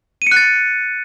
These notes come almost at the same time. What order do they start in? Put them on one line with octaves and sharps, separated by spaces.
D#7 C#7 F#6 A6